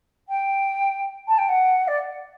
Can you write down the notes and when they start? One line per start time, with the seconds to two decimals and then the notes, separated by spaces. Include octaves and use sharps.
0.28 G5
1.27 A5
1.38 G5
1.48 F#5
1.87 D5